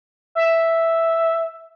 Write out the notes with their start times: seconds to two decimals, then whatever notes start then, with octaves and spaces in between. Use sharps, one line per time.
0.35 E5